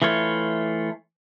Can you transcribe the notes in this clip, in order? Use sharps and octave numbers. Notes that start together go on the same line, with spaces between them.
E3 A3 F4 C#5